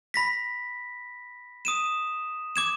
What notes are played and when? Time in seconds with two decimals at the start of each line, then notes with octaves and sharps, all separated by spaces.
0.14 B5 A#6 B6
1.65 D#6 D#7 E7
2.56 D6 G#6 E7